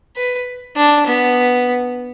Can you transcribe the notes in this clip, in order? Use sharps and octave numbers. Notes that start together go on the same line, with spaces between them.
B4
D4
B3